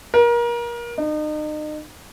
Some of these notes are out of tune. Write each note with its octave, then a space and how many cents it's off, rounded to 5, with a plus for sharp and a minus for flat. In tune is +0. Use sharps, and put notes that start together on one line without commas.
A#4 +30
D#4 -35